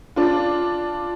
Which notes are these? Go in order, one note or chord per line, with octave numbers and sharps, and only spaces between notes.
D4 F4